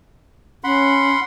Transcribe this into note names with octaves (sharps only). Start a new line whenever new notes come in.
C#4 F#5 B5 C6